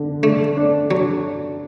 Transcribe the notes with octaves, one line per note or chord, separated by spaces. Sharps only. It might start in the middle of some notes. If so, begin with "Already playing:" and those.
Already playing: D3
A3 D4
D4
F#3